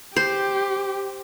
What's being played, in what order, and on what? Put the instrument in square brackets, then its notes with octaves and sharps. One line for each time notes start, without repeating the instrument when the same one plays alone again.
[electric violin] G4 [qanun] C5